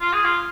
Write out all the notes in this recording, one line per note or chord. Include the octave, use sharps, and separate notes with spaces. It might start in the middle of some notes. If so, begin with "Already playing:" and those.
F4
G#4
F4